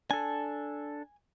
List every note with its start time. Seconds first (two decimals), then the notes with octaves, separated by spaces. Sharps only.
0.11 D4 A4 G#5